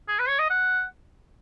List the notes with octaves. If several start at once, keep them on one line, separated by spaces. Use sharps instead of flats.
G#4
B4
C#5
D#5
F#5